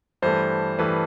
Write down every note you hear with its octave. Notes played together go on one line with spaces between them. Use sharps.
G2 E3 A3 C5
G2 E3 A3 B4